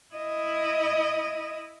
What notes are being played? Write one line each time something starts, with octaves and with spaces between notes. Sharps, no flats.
E4 D#5